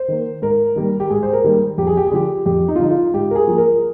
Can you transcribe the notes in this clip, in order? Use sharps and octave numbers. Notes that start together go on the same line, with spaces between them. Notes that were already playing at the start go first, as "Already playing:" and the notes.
Already playing: C5
D#3 A#3
G#2 A#4
D#3 G3 A#3
G4
G#2 G#4
C5
A#4
D#3 G3 A#3
F2 G4
G#4
G4
G#4
D3 F3 G4
F2 G4
D#4
F4
D3 F3 D#4
F4
G#2 G4
A#4
G#4
F3 A#3
A#4